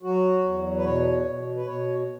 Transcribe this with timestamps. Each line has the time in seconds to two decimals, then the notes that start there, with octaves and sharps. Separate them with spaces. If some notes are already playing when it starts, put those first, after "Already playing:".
0.03 F#3 F#4
0.44 E2
0.77 B4
0.84 B2 C#5
1.25 B2
1.56 B4
1.66 B2 C#5